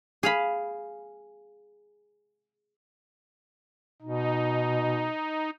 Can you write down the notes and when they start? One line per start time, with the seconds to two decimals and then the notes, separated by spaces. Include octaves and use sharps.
0.23 G#4 F5 B5
4.02 B2 D#4